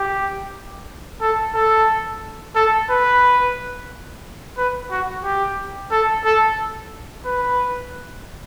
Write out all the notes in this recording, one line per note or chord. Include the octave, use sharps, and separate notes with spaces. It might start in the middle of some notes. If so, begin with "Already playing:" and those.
Already playing: G4
A4
A4
A4
B4
B4
F#4
G4
A4
A4
B4